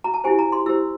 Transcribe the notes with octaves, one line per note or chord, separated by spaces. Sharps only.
A#5
A5
E4 G4 C5 G#5
A#5
C6
E4 G4 C5 E6